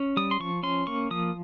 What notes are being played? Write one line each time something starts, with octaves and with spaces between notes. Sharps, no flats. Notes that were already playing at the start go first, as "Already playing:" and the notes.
Already playing: C#4
G3 D#6
C6
F3 C#6
C#4 C6
A#3 C#6
F3 D#6